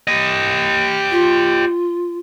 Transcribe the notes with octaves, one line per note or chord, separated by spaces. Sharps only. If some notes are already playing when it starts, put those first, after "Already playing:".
G4 D#5
F4